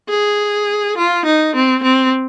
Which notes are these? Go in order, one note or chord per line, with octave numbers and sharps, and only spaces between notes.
G#4
F4
D#4
C4
C4